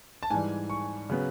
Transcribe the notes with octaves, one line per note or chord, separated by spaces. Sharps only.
A5
G#2 E3 G3 G#5
C#6
C#3 F#3 B3